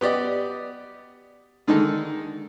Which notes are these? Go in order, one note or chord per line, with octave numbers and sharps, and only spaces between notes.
B3 G4 D5 D#5
D3 D#3 G#3 D#4 A4